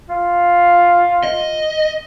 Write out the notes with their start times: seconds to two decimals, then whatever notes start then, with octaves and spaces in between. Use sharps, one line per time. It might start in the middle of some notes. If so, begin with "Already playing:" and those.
0.09 F4
1.23 D#5